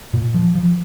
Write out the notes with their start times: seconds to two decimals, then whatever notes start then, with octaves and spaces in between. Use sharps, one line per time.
0.14 A#2
0.34 F3
0.55 F3